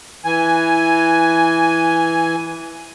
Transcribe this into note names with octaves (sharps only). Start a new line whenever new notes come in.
E3 G#5